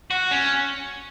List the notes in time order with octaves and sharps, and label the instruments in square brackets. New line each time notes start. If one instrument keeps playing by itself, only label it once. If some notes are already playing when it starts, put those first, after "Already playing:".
[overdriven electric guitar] F#4
C#4